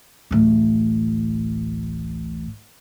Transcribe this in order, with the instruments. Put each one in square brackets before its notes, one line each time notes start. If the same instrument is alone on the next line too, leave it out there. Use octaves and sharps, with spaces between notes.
[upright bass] D1 A1